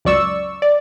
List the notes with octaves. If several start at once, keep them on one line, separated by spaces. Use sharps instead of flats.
C#2 F#2 D5 C#6 E6
D5